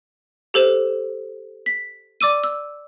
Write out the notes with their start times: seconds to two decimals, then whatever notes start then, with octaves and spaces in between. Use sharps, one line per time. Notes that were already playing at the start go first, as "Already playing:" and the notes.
0.54 G4 A4 C5 E7
1.66 B6
2.21 D5 D6 E6 D#7
2.44 E6